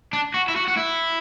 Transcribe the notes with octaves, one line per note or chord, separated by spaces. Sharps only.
D4
F#4
E4
F#4
F#4
E4